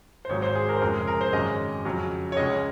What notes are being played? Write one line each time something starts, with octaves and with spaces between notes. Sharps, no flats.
C5
G#1 G#2 F#3 C#5
C5
G#4
A#4
C5
F1 F2 C#3 G#3 A#4
G#4
A#4
C5
G#1 F#2 C#3 G#3 D#5
F2 C#3 F#3
C#5
C#2 C#3 G#3 D#5